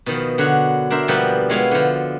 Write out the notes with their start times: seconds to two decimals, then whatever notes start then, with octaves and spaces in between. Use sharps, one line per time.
0.06 B2 D#3 F3
0.38 D3 F#3 F#4
0.90 D4 A#4 C5 E5
1.08 B2 F3 G3 A#3 F#5
1.50 G#3 B3 E4 F4 C#5 F5
1.71 D3 F3